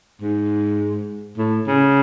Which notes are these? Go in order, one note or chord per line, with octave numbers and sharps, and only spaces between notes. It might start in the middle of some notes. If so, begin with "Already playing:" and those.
G#2
A2
C#3